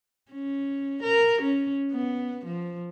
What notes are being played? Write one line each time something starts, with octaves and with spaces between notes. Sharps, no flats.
C#4
A#4
C#4
B3
F3